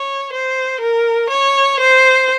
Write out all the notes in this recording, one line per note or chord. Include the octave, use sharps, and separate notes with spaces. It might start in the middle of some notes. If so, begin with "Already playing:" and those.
Already playing: C#5
C5
A#4
C#5
C5